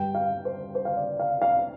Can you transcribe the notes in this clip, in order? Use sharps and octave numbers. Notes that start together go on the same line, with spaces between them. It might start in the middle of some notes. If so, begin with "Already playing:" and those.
Already playing: G2 G3 G5
F5
C5
C5
F5
D5
F5
F5